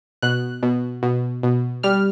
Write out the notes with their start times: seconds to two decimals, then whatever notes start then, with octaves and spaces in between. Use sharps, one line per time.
0.22 B2 F#6
0.63 B2
1.03 B2
1.43 B2
1.83 G3 F6